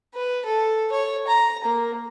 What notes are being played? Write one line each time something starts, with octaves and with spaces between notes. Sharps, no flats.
B4
A4
C#5
A#5
A#3